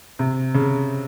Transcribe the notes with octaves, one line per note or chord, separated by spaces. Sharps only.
C3
C#3